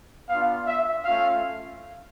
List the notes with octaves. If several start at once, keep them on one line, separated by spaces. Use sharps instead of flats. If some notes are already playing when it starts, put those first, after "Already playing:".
B3 D4 F4 F5
E5
A3 C#4 F4 F5